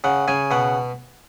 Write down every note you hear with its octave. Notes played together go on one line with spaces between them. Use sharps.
C#3 F#5
C#3 G#5
B2 F#5